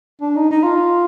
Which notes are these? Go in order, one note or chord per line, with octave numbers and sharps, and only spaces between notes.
D4
D#4
D#4
F4